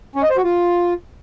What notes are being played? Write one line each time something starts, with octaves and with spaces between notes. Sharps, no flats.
C#4
D#5
C5
F#4
F4